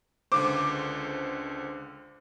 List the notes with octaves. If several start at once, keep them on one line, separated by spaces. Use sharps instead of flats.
C#2 D3 C5 D6